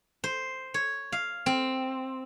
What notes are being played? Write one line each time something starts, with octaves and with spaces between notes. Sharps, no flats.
C5
C#5
F5
C4